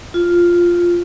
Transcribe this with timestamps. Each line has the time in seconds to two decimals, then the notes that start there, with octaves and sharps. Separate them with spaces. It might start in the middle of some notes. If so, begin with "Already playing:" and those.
0.14 F4